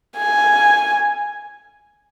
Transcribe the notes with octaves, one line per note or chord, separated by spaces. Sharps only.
G#5